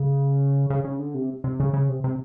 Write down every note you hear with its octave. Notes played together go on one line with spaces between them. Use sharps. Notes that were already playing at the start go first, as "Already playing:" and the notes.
Already playing: C#3
C#3
C#3
D3
C3
C3
C#3
C#3
C3
C3